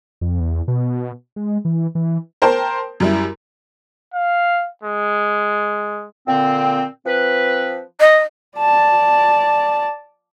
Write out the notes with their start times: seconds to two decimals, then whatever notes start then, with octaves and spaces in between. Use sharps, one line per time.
0.21 F2
0.40 E2
0.68 B2
1.36 G#3
1.65 E3
1.95 E3
2.42 A#4 C5 G5 A5 C6
3.00 F#2 G3 E4
4.14 F5
4.83 G#3
6.26 A#2 D3 C4
7.05 F3 C4 B4
8.00 D#5
8.58 D5 A5